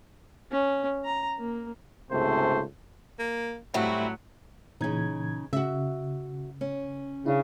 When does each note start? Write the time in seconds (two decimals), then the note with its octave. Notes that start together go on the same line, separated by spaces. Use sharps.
0.52 C#4
1.05 A#5
1.38 A#3
2.11 C#2 G#2 C3 A3 C5
3.19 A#3
3.74 A2 F#3 G3 C4 E4 F#4
4.81 A#2 C#3 E3 D#4 G#6
5.53 C#3 F#4 E5
6.61 C#4
7.26 C#3 D4 E4